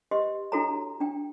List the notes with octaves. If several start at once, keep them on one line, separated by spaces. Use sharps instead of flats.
G4 B4 D#5 C6
D4 E4 F#4 A4 C#5 A#5
D4 G5